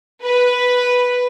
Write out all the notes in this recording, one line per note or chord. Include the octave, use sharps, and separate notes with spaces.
B4